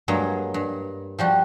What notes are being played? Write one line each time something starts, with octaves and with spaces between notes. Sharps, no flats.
G2 F#3 G#3 A#3
G2
F3 G3 F#4